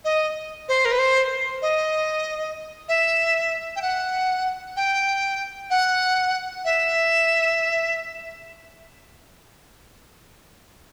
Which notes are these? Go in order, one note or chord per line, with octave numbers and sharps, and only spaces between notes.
D#5
C5
A#4
B4
C5
D#5
E5
G5
F#5
G5
F#5
E5